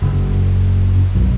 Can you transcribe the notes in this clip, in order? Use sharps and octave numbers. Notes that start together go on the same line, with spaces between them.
F#1
B1